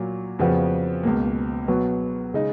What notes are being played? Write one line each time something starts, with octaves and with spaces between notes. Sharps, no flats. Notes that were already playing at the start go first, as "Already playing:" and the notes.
Already playing: A#2 F#3 A#3
F2 C#3 F3 B3 F#4
C#2 B2 A#3
B2 F#3 B3
C#3 G#3 D#4